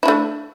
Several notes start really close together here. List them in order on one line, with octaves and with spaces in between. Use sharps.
E4 D4 A3